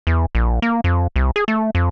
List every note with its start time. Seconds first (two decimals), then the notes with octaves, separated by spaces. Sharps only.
0.07 E2
0.35 A#1
0.62 A#3
0.84 F2
1.16 C2
1.36 G#4
1.48 A3
1.75 F2